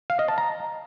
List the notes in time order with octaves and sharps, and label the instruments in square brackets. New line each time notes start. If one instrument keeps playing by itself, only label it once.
[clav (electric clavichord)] F5
D#5
A5
A#5